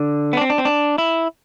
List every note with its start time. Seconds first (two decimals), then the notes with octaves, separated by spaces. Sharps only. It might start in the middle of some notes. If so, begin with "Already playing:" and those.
Already playing: D3
0.33 B3
0.37 D4
0.41 C4
0.50 D4
0.58 C4
0.65 D4
0.98 E4